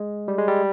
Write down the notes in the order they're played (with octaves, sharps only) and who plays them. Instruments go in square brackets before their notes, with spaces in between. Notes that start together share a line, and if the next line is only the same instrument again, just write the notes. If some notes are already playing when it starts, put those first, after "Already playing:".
Already playing: [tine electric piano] G#3
G3
G#3
G3